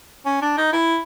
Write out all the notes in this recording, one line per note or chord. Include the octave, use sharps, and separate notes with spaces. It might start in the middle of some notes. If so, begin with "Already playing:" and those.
C#4
D4
D#4
E4